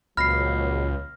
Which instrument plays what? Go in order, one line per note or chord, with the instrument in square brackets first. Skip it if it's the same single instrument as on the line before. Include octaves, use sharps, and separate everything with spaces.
[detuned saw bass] C#2 [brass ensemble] A#2 F3 F#3 [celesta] B5 C7 [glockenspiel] F6 A#6